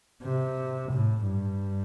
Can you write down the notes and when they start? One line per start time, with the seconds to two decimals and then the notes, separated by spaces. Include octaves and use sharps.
0.23 C3
0.92 A2
1.26 G2